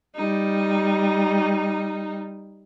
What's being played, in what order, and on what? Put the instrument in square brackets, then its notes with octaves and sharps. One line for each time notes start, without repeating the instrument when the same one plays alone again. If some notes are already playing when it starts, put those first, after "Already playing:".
[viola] G3 D#4